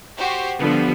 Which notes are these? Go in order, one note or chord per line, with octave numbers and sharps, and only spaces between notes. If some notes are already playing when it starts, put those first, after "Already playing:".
F#4 G4 C5
D3 F3 G3 B3